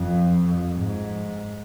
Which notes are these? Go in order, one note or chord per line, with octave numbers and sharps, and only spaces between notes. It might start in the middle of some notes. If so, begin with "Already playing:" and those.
Already playing: F2
G#2